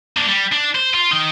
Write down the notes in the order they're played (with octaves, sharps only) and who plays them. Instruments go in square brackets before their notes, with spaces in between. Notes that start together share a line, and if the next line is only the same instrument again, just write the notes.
[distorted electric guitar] A#3 D4
G3
D4
C5
F4
D#4 G5